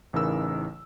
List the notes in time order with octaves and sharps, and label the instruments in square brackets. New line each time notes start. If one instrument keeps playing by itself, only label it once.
[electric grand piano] A1 C#3 E3 D#4 A#4 E6